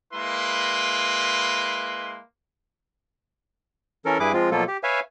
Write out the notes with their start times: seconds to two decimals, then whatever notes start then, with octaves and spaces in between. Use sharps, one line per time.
0.14 G#3 A#3 E4 B4 C6
4.05 E3 C#4 A4 A#4
4.20 G2 E4 G#4 B4 D6
4.33 F3 G#3 C4 F4
4.51 B2 F3 F#3 A#3 F4 A4
4.68 G4
4.83 B4 C#5 E5 F5 G#5